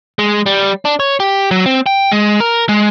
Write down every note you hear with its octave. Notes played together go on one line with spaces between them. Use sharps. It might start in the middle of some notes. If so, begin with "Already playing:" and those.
G#3
G3
D4
C#5
G4
F#3
C4
G5
G#3
A#4
G#3